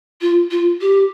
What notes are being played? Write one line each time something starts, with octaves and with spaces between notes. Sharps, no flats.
F4
F4
G4